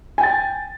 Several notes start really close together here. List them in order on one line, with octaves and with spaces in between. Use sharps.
G#5 G5 A6